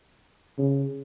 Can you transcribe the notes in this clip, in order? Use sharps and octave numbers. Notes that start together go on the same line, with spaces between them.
C#3